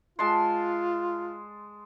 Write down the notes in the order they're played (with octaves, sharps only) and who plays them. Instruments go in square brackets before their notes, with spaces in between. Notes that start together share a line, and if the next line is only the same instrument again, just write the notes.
[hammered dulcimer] G#3 A5 C6 [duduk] F4